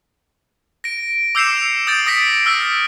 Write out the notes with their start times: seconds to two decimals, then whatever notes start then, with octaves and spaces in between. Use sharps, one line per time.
0.84 A#6 D7
1.35 D6 E6 G6 C7 C#7 E7
1.87 D#6 G6 A6 D7
2.07 D#6 A#6 B6 D7
2.46 E6 F6 A#6